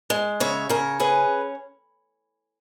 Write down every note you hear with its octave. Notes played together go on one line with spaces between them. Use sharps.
G#3
C#3 C#5 E5
C#3 A#4 C#5
C#4 G#4 B4